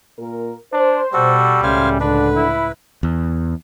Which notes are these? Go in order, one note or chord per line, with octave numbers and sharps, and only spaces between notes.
A#2 A#4
D4 C5
B2 G3 F#4 A4
C#2 A2 G#3 A3 C#4 C5 F5 G#5
D3 D4 B4
E4
E2